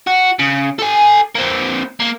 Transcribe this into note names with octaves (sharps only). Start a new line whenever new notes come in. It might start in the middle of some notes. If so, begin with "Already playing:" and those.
F#4
C#3
A4 G#5
A#3 C4
A#3